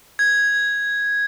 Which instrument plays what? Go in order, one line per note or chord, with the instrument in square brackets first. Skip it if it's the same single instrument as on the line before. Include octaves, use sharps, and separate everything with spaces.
[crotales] G#6